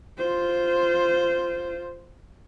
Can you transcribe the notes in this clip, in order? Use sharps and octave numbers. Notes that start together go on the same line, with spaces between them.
F4 C5